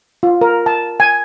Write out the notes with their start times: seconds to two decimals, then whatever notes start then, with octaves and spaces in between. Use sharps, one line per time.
0.23 F4
0.41 A#4
0.66 A5
1.00 G#5